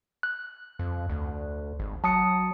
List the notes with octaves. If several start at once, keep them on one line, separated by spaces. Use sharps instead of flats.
F#6
F2
D2
G#1
F#3 A5 D#6 C#7